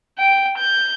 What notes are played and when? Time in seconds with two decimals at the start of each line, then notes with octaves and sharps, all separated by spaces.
0.18 G5
0.58 G6